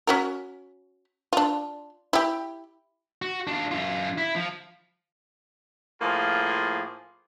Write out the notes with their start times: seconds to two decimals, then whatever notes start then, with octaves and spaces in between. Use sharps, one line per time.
0.07 C#4 F#4 A#4
1.33 D4 F4
2.13 E4 G4
3.22 F#4
3.47 D4 F4
3.71 F#2 F4
4.18 E4
4.36 F3
6.01 A2 F3 A#3 F4 G#4